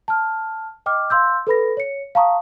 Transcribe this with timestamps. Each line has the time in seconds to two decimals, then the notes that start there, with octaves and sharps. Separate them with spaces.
0.08 A5 F6
0.86 D#5 G5 D6 F6
1.10 F5 C6 E6 G6
1.47 A4 B4 B5 A#6
1.77 C#5 C#7
2.15 F5 A5 A#5 C#6 D#6